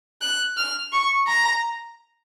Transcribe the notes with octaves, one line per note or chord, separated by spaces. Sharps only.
F#6
F6
C#6
A#5